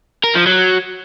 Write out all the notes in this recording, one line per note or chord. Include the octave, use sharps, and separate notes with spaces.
A#4
F3
F#3